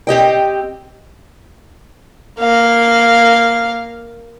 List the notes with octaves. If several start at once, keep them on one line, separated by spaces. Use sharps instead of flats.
C4 G4 D#5 G5
A#3 F5